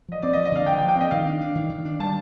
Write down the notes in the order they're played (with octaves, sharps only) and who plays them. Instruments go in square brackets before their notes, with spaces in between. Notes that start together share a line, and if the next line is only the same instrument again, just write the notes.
[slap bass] F3 [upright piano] D#5
[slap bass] C4 [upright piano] D5
[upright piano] D#5
[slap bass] F3
[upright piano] D#5
[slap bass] D3 [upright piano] F5
[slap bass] F3 [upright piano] G5
[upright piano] G5
[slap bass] F3
[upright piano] G5
[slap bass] C4 [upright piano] D#5
[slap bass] D#3 [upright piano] F5
[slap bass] D4
D4
D#3
D#3
D4
[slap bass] G3 [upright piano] A5